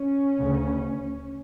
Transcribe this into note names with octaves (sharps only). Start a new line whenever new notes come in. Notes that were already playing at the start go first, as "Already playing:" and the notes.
Already playing: C#4
D2 C#3